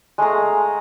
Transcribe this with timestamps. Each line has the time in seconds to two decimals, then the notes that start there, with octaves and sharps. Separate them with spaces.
0.18 G#3 A3 F5 A#5